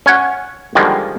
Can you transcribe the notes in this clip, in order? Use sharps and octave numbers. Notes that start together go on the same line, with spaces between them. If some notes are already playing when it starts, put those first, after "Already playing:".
C#4 C#5 F#5
D3 D#3 F3 G3 G#3 A#3